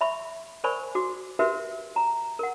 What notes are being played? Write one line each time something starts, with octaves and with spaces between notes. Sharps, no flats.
E5 B5 C#6
A#4 C5 D5 G#5 B5 C#6
F#4 D6
F#4 G4 A#4 B4 E5
A#5
A#4 F#5